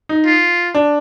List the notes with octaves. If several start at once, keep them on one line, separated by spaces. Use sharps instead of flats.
D#4
F4
D4